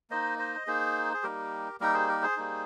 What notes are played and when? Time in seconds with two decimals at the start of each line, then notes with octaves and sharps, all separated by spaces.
0.10 A#3 D#4 C5 D#5
0.39 C5 D#5
0.67 A#3 D#4 G#4 C5
1.13 G#4
1.23 G3 A#3 D#4 G4 A#4
1.80 G3 A#3 D#4 G4 A#4
1.94 G#4 C5
2.08 G4 A#4
2.22 G#4 C5
2.37 G3 A#3 D#4